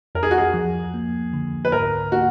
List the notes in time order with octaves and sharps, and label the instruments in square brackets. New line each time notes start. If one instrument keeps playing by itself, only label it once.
[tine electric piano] F2 [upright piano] A#4
[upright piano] G#4
F#4
G#4
[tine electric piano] F3
A#3
D3
[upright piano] B4
[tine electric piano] G#2 [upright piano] A#4
[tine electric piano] A#3 [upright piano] F#4